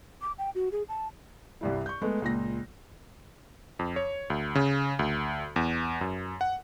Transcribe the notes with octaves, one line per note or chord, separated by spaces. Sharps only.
D6
G5
F#4
G#4
A5
C2 G2 E4
C#6 G6
G#3 A3 B3
C#2 A#2 A#6
F2
C#5
D2
C#3
D2
E2
F#2
F#5